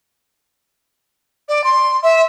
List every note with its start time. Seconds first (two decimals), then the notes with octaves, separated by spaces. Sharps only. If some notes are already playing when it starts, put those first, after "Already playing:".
1.49 D5
1.64 C6
2.03 E5